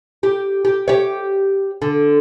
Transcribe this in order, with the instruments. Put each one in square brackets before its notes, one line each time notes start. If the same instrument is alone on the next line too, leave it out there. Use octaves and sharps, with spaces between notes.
[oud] G4
G4
G4 C#5
D3